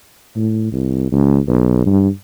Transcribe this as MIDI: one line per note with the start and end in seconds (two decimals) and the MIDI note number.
0.36 0.68 45
0.72 1.09 36
1.12 1.38 37
1.48 1.82 35
1.86 2.08 43